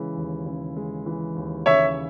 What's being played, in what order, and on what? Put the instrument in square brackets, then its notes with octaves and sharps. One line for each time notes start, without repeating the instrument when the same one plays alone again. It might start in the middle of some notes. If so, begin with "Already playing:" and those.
Already playing: [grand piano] C#3 E3 G#3
D#2
C#3
G#3
E3
D#2
[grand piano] C#3 [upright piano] C#5 E5